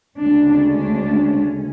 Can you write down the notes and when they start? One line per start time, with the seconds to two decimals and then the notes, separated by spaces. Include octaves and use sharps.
0.20 D2 C#3 G#3 C#4 D4
0.68 D4